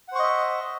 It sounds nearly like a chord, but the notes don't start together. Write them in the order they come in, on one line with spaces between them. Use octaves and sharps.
F#5 C5 C#6 D#5 E5